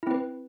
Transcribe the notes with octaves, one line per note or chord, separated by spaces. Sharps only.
C4 E4 B4